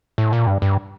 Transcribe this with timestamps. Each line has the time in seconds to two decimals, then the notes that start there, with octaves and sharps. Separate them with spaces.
0.18 A2
0.33 A#2
0.47 G2
0.62 G2